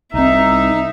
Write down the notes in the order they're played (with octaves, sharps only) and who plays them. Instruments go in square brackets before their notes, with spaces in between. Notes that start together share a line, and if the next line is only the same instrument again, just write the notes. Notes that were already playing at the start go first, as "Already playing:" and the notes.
[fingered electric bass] C2 C4 [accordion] D#4 [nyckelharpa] E5